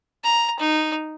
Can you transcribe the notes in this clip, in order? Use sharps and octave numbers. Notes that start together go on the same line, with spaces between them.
A#5
D#4